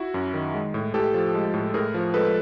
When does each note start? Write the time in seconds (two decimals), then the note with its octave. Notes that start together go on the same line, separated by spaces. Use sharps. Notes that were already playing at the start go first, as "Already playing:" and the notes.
Already playing: E4 F#4
0.14 F#2
0.34 D#3
0.54 G#3
0.74 A2
0.94 A2 G4 A4
1.14 F3
1.34 G#3
1.54 A2
1.74 A2 G#4 A#4
1.94 F3
2.14 G#3 A4 B4